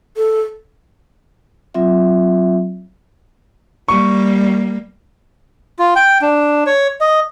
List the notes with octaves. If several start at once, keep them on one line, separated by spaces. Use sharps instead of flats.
A4
F#3 C4 F4 E5
G3 A#3 C#6
F4
G5
D4
C#5
D#5